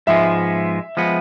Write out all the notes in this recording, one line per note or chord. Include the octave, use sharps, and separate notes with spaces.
G#2 F3 G#3 B3 E5
F3 G#3 B3